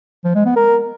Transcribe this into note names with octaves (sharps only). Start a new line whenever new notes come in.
F3
G#3
B3
A#4